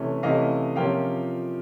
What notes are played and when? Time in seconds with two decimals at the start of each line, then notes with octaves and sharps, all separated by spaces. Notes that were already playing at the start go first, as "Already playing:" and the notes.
Already playing: C3 E3 A3 C#4
0.23 C3 E3 A3 C#4 D#5 F5
0.76 C3 F3 A#3 C#4 F5 G5